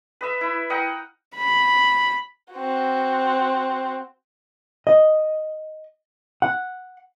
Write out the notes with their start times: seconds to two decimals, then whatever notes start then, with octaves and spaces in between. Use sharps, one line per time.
0.21 B4 D#5 E5
0.41 E4
0.70 A#4 D#5 F#5 G5
1.36 B5
2.53 C4 F#4
4.87 D#5
6.42 F#5